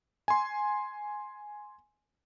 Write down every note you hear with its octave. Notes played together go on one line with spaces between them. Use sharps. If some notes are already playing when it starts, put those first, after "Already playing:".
G#5 C6